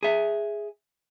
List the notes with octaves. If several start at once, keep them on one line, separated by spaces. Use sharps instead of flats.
G#4 E5